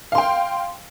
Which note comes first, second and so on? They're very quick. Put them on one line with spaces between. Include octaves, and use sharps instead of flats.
F5 C6 G5